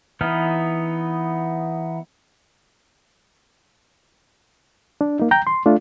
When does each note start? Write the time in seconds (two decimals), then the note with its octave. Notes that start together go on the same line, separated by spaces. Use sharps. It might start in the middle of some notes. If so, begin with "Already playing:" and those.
0.21 E3 B3 D#4 F6
5.01 D4
5.20 A#3 D#4
5.31 G5 A#5 G6
5.47 C6
5.66 A3 D4 F4